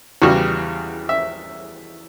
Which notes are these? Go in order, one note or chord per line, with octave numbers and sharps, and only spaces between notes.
E2 C#3 G3 F#4
E5